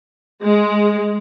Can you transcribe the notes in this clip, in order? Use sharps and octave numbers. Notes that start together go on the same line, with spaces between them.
G#3